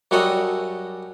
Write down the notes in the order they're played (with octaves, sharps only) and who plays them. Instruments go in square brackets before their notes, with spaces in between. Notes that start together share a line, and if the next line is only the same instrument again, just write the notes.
[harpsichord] F#2 G3 F#4 A4 C#5 D#5